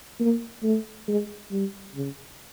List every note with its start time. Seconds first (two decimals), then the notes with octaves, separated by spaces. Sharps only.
0.20 A#3
0.64 A3
1.08 G#3
1.51 G3
1.95 C#3